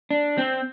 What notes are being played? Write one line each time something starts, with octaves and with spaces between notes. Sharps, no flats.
D4
C4